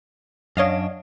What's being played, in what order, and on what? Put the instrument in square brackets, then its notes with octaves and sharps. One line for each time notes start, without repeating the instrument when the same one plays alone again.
[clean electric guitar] F#2 D4 [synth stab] C#5 D#5 F5